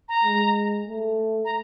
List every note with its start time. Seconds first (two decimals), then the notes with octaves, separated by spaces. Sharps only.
0.09 A#5
0.24 G#3
0.88 A3
1.45 A#5